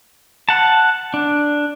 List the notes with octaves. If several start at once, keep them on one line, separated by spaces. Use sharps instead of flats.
F#5 A5
D4